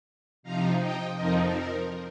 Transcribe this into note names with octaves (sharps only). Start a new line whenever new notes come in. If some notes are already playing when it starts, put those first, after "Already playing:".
C3 F3 D#4 F5 A#5
D#5 G5
F2 F3 C4 D#4 A#4 D#5
A#4